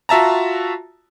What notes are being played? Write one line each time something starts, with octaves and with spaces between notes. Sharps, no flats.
F4 F#4 E5 A5 A#5